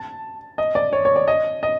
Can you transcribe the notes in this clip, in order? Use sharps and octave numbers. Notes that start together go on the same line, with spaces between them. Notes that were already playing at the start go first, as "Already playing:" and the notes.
Already playing: A5
D#5
D5
C#5
C#5
D5
D#5
D#5